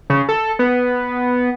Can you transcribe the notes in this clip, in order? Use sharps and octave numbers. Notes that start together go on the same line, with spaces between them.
C#3
A4
B3